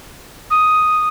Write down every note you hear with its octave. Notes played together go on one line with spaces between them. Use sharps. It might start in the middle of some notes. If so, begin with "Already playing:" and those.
D#6